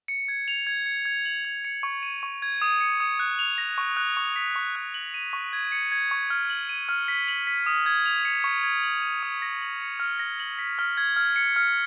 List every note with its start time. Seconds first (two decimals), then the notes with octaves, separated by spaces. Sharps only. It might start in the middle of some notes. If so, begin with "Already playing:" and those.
0.08 C#7
0.28 G#6
0.48 F7
0.67 G#6
0.86 C#7
1.05 G#6
1.25 F#7
1.45 G#6
1.65 C#7
1.83 C#6
2.03 D#7
2.23 C#6
2.42 G#6
2.62 D#6
2.81 C#7
3.00 D#6
3.20 F#6
3.39 F7
3.58 A#6
3.78 C#6
3.97 F#6
4.17 C#6
4.36 B6
4.56 C#6
4.76 F#6
4.94 F#7
5.14 D#7
5.33 C#6
5.53 G#6
5.72 C#7
5.92 G#6
6.11 C#6
6.30 F6
6.50 F#7
6.69 D#7
6.89 F6
7.08 B6
7.28 F#7
7.47 B6
7.66 D#6
7.86 G#6
8.06 F7
8.25 C#7
8.44 C#6
8.64 G#6
8.83 F#7
9.02 D#7
9.23 D#6
9.42 A#6
9.62 F#7
9.81 C#7
10.00 F6
10.19 A#6
10.40 F#7
10.59 B6
10.79 F6
10.97 G#6
11.16 F6
11.36 C#7
11.56 F6